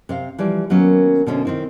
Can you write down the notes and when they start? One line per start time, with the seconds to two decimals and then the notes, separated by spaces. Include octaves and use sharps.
0.09 C3 C5 F5
0.39 E3 F3 G3 D5
0.70 D#3 F#3 A#3 B3 C#4
1.27 B2 D3 C#4 G#4 C5 E5
1.45 D#3 C4 E4